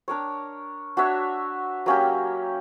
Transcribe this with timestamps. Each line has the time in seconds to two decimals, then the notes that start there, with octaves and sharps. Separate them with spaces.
0.08 D4 A#4 C#5
0.97 D4 F#4 C#5 E5
1.86 F#3 A#3 C#4 G4